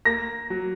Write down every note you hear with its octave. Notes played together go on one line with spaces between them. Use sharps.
A#3 A#6
F#3